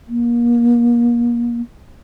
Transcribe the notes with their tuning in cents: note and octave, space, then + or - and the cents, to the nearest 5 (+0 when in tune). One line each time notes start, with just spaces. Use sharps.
A#3 +30